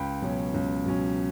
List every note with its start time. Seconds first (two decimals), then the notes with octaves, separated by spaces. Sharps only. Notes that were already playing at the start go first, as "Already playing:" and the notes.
Already playing: C#2 G5 B5
0.22 B2 F#3 C#4
0.54 C#2
0.86 B2 F#3 C#4